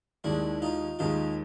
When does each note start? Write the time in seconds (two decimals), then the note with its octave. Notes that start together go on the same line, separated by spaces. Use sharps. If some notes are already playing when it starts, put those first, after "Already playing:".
0.24 D#2 D#3 G#3 D4 E4
0.62 D#4 F4
0.99 D#2 D#3 G#3 D#4 F4